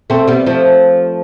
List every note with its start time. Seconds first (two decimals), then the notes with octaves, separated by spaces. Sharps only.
0.10 A3 C4
0.28 G3 B3
0.47 F3 A3